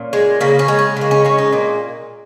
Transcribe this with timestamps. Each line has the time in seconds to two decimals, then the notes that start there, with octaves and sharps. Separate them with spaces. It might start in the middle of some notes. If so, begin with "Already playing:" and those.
Already playing: A#2 C#4
0.13 G#3
0.41 C#3 A#3
0.59 C#4
0.68 G#3
0.79 C#4
0.97 C#3 A#3
1.11 C#4
1.24 G#3 C#4
1.38 D#4
1.53 A#2 A#3